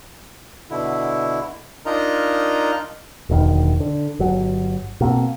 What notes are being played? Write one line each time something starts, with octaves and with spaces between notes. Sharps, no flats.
B2 D3 E4
D4 D#4 F4 A#4 D#5 A#5
E1 D2 D3 D#3
D3
G1 F#3
B2 A#3 C4